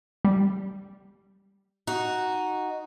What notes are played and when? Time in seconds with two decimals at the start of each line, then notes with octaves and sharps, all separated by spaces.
0.25 G3
1.87 D#4 F#4